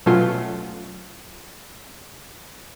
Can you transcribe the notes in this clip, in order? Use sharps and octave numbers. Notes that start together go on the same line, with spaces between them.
B2 F#3 A3 C#4 F4